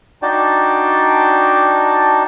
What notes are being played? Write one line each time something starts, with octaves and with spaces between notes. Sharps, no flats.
D4 D#4 F#4 D5 G5 A5